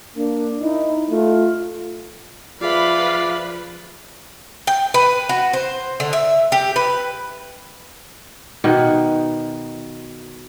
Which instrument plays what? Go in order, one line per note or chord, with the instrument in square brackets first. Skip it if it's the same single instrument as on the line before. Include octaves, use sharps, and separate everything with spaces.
[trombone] A#3 [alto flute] D4
[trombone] D#4 [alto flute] E4
[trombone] A3 [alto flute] F4
[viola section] F3 B4 [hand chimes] F4 G#4 E5 [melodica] D5 [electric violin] F5 B5
[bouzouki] G5
B4
F#4
C5
D3
E5
G4
B4
[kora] B2 D#3 B3